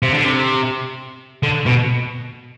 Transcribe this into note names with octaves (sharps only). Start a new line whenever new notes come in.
C3
D3
C3
D3
B2